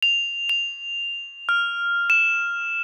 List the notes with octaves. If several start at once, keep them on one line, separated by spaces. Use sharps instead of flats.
F7
F7
F6
E7